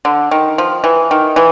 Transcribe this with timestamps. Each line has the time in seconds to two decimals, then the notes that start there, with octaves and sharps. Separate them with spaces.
0.05 D3
0.31 D#3
0.58 F3
0.84 E3
1.11 D#3
1.36 E3